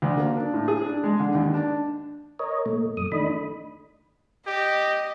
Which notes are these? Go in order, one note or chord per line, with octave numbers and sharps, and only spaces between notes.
D2
A#3
D4
A2
G#4
D4
G#3
D3
D#2
D4
A#4 C#5 D#5
A#2 A3
F#2 D#6
D#3 A3 D4 D#5 B5
G4 D#5